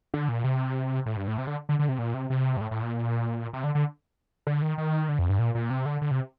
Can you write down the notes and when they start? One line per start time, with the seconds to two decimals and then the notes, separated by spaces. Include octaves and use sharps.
0.14 D3
0.29 A#2
0.44 C3
1.06 A2
1.17 G2
1.28 A2
1.38 C3
1.47 D3
1.69 D3
1.79 D3
1.89 C3
1.99 A#2
2.14 C3
2.30 C3
2.57 G2
2.61 A2
2.71 A2
2.82 A#2
3.53 C3
3.64 D3
3.75 D3
4.47 D3
4.62 D#3
4.78 D#3
5.09 D3
5.19 F2
5.29 G2
5.39 A#2
5.55 A#2
5.70 C3
5.86 D3
6.02 D3
6.11 C3